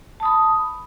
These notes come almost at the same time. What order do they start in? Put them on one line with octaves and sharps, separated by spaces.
A5 D#6 B5